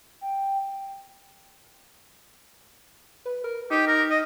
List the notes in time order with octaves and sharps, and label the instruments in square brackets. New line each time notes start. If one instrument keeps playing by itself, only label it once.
[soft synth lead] G5
[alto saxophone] B4
A#4
[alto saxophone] D#4 [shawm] G4
[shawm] A#4
D#5